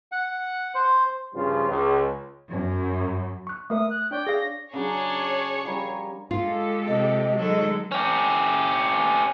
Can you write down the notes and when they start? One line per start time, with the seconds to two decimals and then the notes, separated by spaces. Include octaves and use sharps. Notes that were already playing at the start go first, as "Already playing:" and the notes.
0.12 F#5
0.75 C5
1.35 G2 C#3 F3 G3 F4
1.68 C#2
2.50 F#2
3.47 C#6 F#6
3.70 A3 A#4 E5 D#6
3.90 F#6
4.11 D4 C#5 D5 G5
4.26 G#4 F5 A#6
4.73 C#3 F#3 D4 G#4 C#5
5.65 F3 G3 A#4
6.31 G#3 F4 G4 A4
6.88 C3 D#5
7.36 D#3 F#3 G#3 A4
7.92 C#4 G4